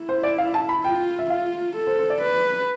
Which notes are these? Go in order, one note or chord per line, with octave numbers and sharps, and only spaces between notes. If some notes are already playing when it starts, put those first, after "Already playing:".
Already playing: E4
C5
D5
F5
A5
B5
F4 G5
E5
F4 F5
A4
C5
C5
D5
B4